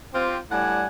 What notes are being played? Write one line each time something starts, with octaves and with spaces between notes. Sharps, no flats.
C4 F4 G4
A2 G3 D4 F#5 G#5